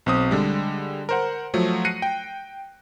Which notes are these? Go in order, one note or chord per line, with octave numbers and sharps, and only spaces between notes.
B1 C4 D#6
D3 G3 G#3
A#4 C5 F#5
F3 F#3 A3
F#6 A#6 C7 C#7 D#7
G5